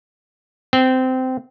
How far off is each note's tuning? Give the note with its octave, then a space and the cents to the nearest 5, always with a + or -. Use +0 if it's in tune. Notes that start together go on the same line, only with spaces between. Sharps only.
C4 -20